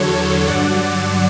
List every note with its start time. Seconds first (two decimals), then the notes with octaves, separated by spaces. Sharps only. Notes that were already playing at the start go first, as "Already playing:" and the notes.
Already playing: E2 D3 F#3 A4 C#5
0.47 G2 D3 F#3 D5 F#5